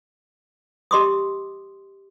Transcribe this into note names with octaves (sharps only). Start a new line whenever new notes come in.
G4 D#5 C6 D6 D#6